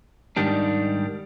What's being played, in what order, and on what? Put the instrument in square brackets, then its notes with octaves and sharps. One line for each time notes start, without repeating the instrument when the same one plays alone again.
[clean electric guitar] G#2 D#3 G3 D4